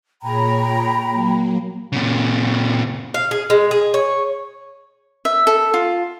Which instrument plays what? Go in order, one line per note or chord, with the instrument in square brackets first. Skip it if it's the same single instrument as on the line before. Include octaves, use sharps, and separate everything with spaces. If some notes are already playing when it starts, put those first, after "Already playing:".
[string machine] A#2 G#4 C#5 [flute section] G5 A#5 B5
[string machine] F#3 A#3
[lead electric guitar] A#2 C#3
[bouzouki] F5
G#4
G#3
G#4
C#5
[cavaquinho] E5
A4
F4